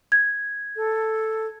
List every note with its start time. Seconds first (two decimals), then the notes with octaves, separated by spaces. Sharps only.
0.12 G#6
0.76 A4